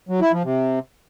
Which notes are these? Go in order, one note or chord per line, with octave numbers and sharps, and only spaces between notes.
F#3
E4
F3
C3